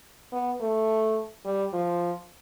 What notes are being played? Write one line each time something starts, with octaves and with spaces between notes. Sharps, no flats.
B3
A3
G3
F3